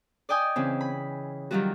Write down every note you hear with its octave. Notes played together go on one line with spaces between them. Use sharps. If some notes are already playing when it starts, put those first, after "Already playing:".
D5 D#5 G5 G#5 D#6
C#3 E3 C4
B5
D#3 F#3 G3 F4 F#4